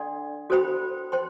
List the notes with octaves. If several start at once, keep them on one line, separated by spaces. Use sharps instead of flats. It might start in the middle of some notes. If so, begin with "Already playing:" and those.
Already playing: D4 A4 D5 F#5 C6
F#4 A4 C5 G5 B5
C5 G5 C6